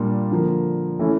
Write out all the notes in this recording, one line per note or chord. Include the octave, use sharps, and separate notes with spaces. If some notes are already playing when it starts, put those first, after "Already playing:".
Already playing: A#2 G3 A#3 D4 F4
D3 F3 A#3
E3 A3 C#4 E4